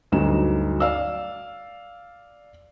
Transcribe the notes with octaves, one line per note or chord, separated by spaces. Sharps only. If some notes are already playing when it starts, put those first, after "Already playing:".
D2 G2 F#3 D#4 E7
D5 F5 E6